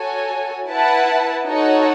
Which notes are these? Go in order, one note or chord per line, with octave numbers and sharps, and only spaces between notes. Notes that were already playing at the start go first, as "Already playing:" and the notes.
Already playing: F#4 A4 C#5 G#5
E4 B4 F#5 A5
D#4 F#4 A4 C#5 F#5